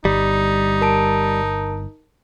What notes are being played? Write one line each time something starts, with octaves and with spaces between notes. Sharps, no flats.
G1 G3 D#4
A#4 A5 D7